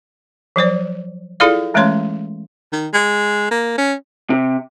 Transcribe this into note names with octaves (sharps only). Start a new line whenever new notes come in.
F3 F#3 C5 D5
E4 F4 G#4 A4 D5 F5
E3 G#3 A3 C#4 C#5 C6
D#3
G#3
A#3
C#4
C3